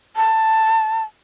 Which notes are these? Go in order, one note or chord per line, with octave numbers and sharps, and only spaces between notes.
A5